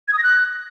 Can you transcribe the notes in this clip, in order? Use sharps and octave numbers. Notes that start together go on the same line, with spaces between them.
G#6
D#6
A#6
F#6